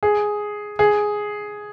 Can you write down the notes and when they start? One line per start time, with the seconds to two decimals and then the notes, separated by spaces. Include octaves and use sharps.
0.03 G#4
0.79 G#4